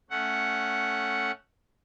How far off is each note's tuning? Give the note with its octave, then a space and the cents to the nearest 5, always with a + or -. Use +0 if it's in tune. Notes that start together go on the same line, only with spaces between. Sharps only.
A3 +0 C#4 +0 F#5 +0